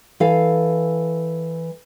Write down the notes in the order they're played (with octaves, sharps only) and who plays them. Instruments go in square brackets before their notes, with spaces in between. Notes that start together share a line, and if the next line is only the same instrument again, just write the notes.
[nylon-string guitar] E3 A4 F5